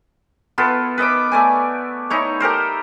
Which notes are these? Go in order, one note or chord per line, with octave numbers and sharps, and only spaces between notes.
B3 E4 F4 A4
B4 D#5 E5 D6
A3 D5 G#5
D#4 E4 C#5
G4 A4 A#4 C5